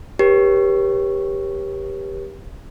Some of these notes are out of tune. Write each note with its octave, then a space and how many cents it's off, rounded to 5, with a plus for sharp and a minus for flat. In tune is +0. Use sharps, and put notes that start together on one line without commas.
G4 +10 A#4 +45 C#5 -30